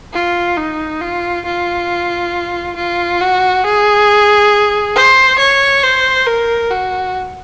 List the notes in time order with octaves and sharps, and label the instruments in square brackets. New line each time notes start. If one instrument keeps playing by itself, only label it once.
[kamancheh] F4
D#4
F4
F4
F4
F#4
G#4
C5
C#5
C5
A#4
F#4